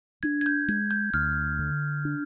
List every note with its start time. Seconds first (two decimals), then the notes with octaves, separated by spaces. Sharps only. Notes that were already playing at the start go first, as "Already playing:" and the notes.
0.23 D4 G#6
0.41 G#6
0.46 G6
0.68 G#3 G#6
0.91 G6
1.14 D2 F6
1.59 D3
2.05 D4